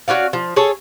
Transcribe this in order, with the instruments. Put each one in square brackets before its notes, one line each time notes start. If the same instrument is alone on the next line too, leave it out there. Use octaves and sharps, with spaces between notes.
[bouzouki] C#4 F#4 D5 F5
F3
G#4 A4 C#5 A5